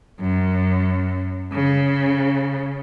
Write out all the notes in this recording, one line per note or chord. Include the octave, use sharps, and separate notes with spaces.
F#2
C#3